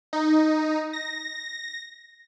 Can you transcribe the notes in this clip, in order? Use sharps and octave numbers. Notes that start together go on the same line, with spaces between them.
D#4
A#6